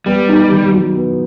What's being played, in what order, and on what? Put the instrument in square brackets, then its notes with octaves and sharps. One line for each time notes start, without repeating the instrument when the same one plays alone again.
[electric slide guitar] G3 [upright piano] B3
[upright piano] D#4
D#3
F#3
B3